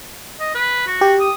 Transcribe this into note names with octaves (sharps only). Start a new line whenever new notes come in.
D#5
B4
F#4
G4
D#6